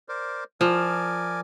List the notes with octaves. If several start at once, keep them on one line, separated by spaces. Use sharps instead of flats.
A#4 C5 D5
F3 A#4 D5 G#5